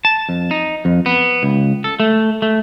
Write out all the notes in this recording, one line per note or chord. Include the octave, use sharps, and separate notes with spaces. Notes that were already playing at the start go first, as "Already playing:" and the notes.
A5
F2
D#4
F2
B3
C#2
A4
A3
A3